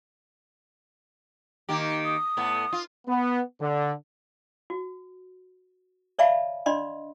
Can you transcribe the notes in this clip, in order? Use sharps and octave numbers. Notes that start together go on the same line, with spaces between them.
D#3 A#3 G4
D#6
A2 A3 B3
F4
B3
D3
F#4
C#5 D5 E5 F5 A5 B5
D4 D5 D#5 B5 C6